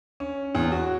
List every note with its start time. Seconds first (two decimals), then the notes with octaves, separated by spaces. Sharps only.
0.20 C#4
0.55 E2
0.72 F#4